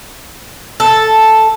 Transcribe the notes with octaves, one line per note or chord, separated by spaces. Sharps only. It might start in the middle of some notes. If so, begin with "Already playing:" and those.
A4